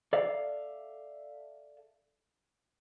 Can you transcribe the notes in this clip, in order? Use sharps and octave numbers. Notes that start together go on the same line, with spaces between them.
A4 D5 E5 F5